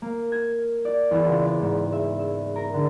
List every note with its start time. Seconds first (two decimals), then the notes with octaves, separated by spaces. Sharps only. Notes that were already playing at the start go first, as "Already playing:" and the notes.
0.02 A#3
0.32 G#6
0.85 D5
1.11 E2
1.26 C#2
1.46 D5
1.62 G#2
1.93 E5
2.19 E6
2.56 A#4
2.74 D3